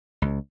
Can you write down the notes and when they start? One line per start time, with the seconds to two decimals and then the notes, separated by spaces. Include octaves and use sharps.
0.22 C#2